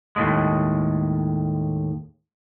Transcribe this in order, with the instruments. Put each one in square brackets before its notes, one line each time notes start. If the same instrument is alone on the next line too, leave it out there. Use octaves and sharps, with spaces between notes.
[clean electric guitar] D#2 A2 G#3